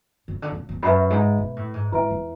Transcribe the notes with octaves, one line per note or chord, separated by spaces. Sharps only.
C#3
D3
B2
C#3
E2
F#2 B4 E5 B5
G#2
B2
A2
G#2
G#2 E4 B4 E5 G#5
E2